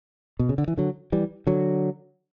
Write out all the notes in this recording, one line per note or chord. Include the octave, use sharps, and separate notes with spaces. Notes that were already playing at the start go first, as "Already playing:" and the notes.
B2
C#3
D3
E3
D3 F#3
E3 G3
D3 F#3